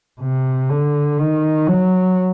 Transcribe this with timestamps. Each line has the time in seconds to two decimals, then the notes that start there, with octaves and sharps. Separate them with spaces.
0.21 C3
0.70 D3
1.19 D#3
1.67 F#3